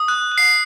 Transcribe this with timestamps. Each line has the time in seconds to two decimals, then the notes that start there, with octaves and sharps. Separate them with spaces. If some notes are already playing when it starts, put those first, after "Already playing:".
Already playing: D#6
0.08 F#6
0.32 F#6
0.38 C7